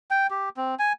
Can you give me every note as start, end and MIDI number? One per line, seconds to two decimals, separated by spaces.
0.11 0.27 79
0.30 0.49 67
0.57 0.75 60
0.79 0.93 80